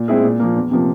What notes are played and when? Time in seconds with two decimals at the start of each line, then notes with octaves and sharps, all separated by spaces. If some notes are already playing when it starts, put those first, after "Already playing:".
Already playing: A#2
0.08 G#3 C4 E4 G#4
0.24 A#2
0.39 F3 A#3
0.56 E2
0.71 C3 F3 A#3